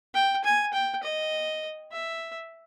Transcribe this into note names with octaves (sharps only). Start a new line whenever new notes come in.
G5
G#5
G5
D#5
E5